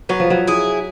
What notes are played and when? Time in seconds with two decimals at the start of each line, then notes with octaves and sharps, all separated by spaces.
0.09 F#3 B3
0.20 F3
0.30 F#3
0.47 E4 G#4